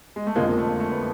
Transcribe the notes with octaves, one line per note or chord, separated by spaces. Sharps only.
G#3
A3
F2 D3 F3 G#3 A#3
A3
A3
B3